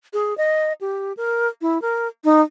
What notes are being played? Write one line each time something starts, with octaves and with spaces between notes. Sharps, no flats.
G#4
D#5
G4
A#4
E4
A#4
D#4